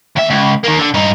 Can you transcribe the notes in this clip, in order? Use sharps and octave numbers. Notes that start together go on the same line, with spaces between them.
D#2 E5
C#2
D#3 A#3
D3
G2 D#4